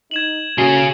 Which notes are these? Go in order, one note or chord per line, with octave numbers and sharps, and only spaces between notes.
D#4 G#6 E7 F#7
C#3 A3 A#3 C#4 F#4 G#4 C7 G7